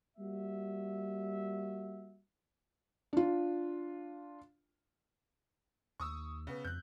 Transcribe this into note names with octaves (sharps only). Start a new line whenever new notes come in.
G3 A#3 F#4 E5
D4 F4
D#2 C#6 D#6 E6
C#3 B3
F2 F#6 G6